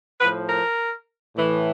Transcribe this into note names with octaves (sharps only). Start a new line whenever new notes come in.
A2 F3 B4
A#4
A2 E3